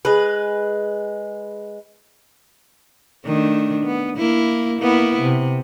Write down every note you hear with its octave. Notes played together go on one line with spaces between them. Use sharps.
G#3 B4
D#3 A3 D4
B3
A#3 E4
A#3 B3 E4
C3